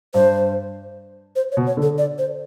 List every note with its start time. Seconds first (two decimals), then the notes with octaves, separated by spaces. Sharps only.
0.14 G2 C5
1.36 C5
1.52 C#5
1.57 B2
1.66 C#5
1.77 D3
1.82 A4
1.98 D5
2.18 C5